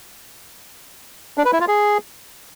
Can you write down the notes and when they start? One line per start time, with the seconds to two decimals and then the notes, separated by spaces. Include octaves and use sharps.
1.38 D4
1.45 B4
1.53 E4
1.60 F4
1.68 G#4